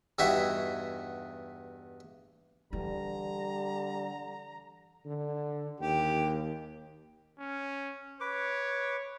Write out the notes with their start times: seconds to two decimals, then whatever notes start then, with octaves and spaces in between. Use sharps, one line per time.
0.19 E2 G2 D#4 E4 F#4 E5
2.73 D3 E3 G3 A#5
5.05 D3
5.80 D#2 G4
7.39 C#4
8.21 B4 C#5 D6